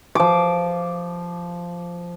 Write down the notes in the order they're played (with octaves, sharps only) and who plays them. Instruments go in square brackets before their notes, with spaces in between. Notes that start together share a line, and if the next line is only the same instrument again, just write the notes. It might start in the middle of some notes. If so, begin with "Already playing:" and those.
[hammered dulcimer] F3 D6